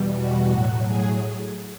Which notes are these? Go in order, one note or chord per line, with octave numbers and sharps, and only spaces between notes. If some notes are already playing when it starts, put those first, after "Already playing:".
Already playing: E2 B2 G3
F#4
A2 F#3
G#4